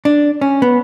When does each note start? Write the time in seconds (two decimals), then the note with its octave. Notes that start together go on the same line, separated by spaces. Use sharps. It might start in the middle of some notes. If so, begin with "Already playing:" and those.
0.05 D4
0.41 C#4
0.62 B3